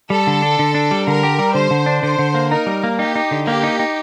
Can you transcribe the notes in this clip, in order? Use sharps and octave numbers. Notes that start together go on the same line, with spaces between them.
G3 A4
D3
D4
D3
D4
G3
D3 A#4
G4
G3
D3 C5
D3
D4
D3 C5
D3
A#3
D#4 A#4
G3
A#3
D#4 G4
D#4
D3
A#3 G4
D#4
D#4